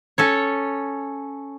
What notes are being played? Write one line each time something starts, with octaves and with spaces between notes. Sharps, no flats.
C#4 A4 C#5